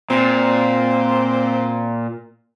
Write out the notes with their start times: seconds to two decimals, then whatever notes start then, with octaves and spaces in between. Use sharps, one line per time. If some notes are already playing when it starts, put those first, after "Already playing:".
0.10 A#2 C4